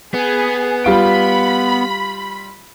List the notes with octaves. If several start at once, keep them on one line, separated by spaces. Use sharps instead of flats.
B3 G#4
G3 F4 B5 D7